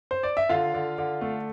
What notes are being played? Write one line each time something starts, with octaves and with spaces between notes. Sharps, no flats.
C5
D5
E5
D3 F4 F5
D3
D3
A3